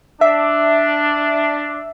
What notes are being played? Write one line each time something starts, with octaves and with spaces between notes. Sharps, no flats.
D4 E5